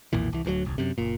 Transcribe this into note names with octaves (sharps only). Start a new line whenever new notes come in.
B1 F2 A#2 E3
C2 E3
D1 D2 D3 F#3
D#1 C2
F#2 C3
F#1 A#2